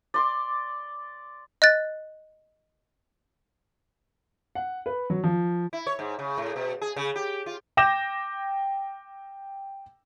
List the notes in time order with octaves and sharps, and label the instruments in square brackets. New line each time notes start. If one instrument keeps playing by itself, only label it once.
[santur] D5 C6 D6
[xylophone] D#5 F#6 A6
[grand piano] F#5
B4
F#3
F3
[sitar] E4
C#5
G#2
C#3
A2
B2
G#4
C#3
G4
F4
[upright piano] G5 D6 G6 A#6 E7